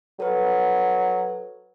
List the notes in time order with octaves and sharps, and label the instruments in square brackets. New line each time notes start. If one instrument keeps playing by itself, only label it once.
[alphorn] F#3 [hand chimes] A4 B4